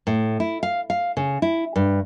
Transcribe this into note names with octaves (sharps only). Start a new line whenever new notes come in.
A2
E4
F5
F5
C#3
E4
G2